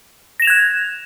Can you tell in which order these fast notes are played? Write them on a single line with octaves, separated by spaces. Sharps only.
A#6 E7 F7 G#6 F#6